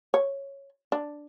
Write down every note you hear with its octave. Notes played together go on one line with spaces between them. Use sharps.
C#5
D4